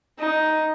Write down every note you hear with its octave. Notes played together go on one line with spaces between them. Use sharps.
D#4